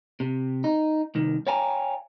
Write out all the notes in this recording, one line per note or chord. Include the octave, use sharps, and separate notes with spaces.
C3
D#4
C2 D#3
C#5 D5 F5 G5 G#5 A#5